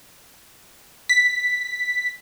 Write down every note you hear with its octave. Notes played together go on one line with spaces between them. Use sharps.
B6